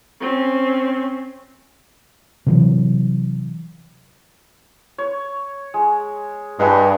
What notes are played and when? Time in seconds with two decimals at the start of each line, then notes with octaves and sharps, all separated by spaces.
0.21 C4 C#4
2.46 C3 E3 F#3
4.98 C#5
5.74 G#3
6.59 G2 G#3 B4 D#5